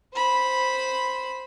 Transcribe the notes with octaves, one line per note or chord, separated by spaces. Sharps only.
C5 B5